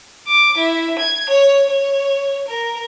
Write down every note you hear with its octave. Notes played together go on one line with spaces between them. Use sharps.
D6
E4
G#6
C#5
C#5
A#4